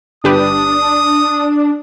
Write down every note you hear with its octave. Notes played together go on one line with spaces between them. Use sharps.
G1 D4 G4 B4 D#6